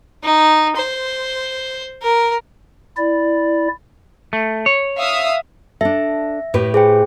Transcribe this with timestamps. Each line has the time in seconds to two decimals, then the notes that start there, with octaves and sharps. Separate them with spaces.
0.23 D#4
0.76 C5
2.02 A#4
2.97 E4 D5
4.33 A3
4.66 C#5
4.98 E5 F5 D#6
5.81 D4 A4 E5
6.54 A2 G4 B4
6.74 G#4 C5 G5